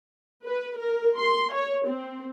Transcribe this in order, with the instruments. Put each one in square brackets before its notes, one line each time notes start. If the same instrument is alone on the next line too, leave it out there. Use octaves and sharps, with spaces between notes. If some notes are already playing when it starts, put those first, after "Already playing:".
[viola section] B4
A#4
C6
C#5
C4